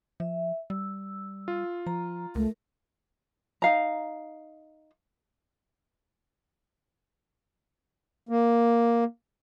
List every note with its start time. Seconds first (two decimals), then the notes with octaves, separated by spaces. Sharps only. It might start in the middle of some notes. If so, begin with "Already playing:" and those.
0.20 F3 E5
0.70 G3 E6
1.48 F4
1.86 F3 A#5
2.35 C#2 A3 A#4
3.62 D#4 F5 A#5
8.29 A#3